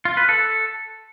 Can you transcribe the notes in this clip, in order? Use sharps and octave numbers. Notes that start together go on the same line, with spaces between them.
F4
B4
A4